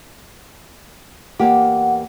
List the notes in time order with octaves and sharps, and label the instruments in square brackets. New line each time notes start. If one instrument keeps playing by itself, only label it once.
[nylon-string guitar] E2 A#3 G4 [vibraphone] F#5